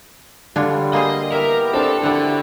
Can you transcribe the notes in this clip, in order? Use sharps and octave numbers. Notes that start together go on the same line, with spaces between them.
D3 G3 D4 F4 C#5
A#3 G#4 C5 D#5
B3 E4 G4 A#4 E5
C4 D4 A4
D3 E4 F#4 G4 A4 F#5